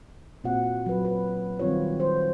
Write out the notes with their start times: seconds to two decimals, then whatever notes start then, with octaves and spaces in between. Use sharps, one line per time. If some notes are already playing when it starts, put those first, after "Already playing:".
0.44 A#2 C4 F4 F#4 F#5
0.86 F#3 B4
1.05 B4
1.59 D#3 G3 C4 F4 C#5
2.00 C5